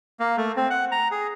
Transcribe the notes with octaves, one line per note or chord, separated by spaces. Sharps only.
A#3
A3
C4
F#5
A#5
G#4